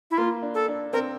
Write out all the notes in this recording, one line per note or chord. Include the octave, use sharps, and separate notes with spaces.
E4
A#3 F4
D4
A4
D4
C4 A#4